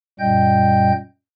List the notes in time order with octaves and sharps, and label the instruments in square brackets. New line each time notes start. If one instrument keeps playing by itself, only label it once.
[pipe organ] F#2 A#2 G3 D#5 G5 G6